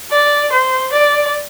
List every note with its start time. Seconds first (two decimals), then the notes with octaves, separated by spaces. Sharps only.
0.12 D5
0.52 C5
0.92 D5